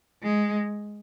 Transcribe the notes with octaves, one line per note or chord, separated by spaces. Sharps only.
G#3